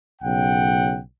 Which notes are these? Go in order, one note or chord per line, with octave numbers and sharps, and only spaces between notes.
B1 C#3 F#5 G5